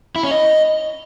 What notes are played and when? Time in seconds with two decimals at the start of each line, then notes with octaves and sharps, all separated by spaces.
0.16 E4
0.23 C#4
0.31 D#5